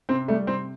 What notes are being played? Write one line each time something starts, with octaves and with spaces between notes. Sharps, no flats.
C3 C4
G3 A3
C3 C4